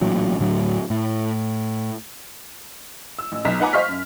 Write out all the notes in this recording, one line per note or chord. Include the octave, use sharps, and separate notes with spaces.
A1 A#2 F#3
D2 A2 F#3
A2
E6
A1
B1 B2 A#5 B6
D#4 B4 F#5 G#5 A#5 D6
C5 D#5 F5 C#6 F6 B6
F#2